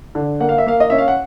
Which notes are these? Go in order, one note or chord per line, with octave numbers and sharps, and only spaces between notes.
D3
A#3 F#5
F5
E5
A#3 F5
D#5
C#4 E5
F5
F#5